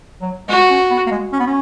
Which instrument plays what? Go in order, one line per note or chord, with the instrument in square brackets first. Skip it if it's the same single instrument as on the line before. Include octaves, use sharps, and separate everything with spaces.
[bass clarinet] F#3
[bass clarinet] G#3 [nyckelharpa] F#4
[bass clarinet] C#4
B3
A#3
G#3
C#4
B3
C#4